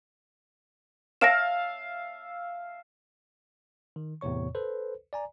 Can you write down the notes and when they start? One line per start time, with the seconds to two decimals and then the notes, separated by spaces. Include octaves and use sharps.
1.21 E5 F5 A5 A#6 D7 E7
3.96 D#3
4.21 E2 A2 C3 C#5 C#6
4.55 A4 B4 C5
5.13 D5 G#5 A#5